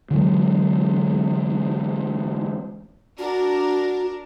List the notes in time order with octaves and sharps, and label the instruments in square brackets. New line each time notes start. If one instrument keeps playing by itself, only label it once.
[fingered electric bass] D3 E3 F#3 G#3
[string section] D4 A#4 [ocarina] F#4